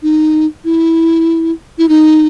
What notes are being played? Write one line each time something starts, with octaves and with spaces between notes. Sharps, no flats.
D#4
E4
E4
D#4